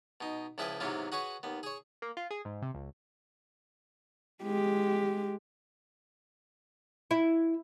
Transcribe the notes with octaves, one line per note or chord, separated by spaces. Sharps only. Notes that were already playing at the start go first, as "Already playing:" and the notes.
B2 D#4
C#2 F3 E4 G#4 B4 G5
G#2 C3 E3 F#3 B3 F4
F#4 G#4 B4 C#5
D#2 B3
G#4 C#5
A#3
F4
G#4
G#2
C3
C#2
G#3 G4
E4